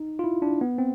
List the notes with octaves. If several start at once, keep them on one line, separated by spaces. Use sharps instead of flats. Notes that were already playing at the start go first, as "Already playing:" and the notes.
Already playing: D#4
F4
E4
D4
B3
C4